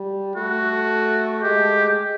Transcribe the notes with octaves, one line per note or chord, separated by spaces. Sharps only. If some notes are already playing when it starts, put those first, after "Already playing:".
Already playing: G3
A3 F#4
G#3 G4